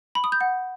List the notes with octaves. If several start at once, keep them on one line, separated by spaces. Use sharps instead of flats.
B5
D#6
G6
F#5